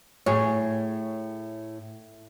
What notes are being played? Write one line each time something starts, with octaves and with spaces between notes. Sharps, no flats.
A2 G#4 C#5